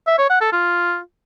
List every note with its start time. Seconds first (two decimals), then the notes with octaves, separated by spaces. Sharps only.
0.07 E5
0.18 C#5
0.30 F#5
0.41 A4
0.52 F4